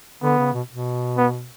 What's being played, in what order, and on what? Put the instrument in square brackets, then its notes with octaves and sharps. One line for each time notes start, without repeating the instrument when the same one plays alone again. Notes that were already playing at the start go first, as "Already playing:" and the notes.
[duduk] D3 [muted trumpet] B3
[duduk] C#3
B2
B2
[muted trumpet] B3